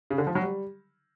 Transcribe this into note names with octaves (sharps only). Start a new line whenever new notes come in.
C#3
D3
F3
F#3
G3